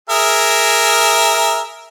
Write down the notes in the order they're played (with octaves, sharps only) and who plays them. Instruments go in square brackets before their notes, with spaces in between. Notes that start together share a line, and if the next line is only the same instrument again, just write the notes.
[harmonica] G#4 A#4 E5